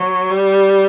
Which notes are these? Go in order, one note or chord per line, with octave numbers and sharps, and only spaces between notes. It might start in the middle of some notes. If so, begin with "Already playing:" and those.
Already playing: F#3
G3